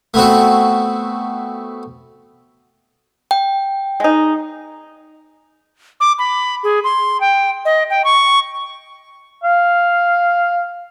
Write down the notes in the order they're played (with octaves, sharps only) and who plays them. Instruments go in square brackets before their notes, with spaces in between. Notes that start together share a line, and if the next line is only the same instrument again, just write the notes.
[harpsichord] A3 B3 C4 F#4
[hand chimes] G5
[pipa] G#3 D#4
[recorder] D6
B5
G#4
C6
G5
D#5
G5
C#6
[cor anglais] F5